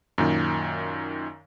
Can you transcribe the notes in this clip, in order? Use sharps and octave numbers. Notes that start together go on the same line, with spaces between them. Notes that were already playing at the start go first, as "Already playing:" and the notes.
F#2 A#2 D#3